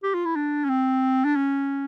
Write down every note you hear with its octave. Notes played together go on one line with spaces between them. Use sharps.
G4
F4
E4
D4
C#4
C4
D4
C#4